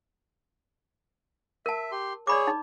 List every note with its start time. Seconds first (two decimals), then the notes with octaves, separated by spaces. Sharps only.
1.66 A#4 E5 A5
1.92 G4 C6
2.27 G#4 C#5 D5 B5 D6
2.47 D#4